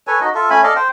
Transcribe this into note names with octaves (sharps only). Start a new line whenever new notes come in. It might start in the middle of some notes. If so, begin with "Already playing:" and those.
A4 B4 C#5 G#5
D#4 F#4 D#5
F4 A4 E5
A3 C#4 G#5 B5
A4 D5 D#5 F5
C5 G5